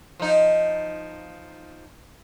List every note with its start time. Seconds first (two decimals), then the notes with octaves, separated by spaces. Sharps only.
0.20 F3 D#4